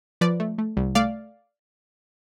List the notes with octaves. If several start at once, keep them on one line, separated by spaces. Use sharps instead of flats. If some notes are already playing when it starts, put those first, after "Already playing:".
F3 B4 D5
A3
A3
C2
A3 D5 F5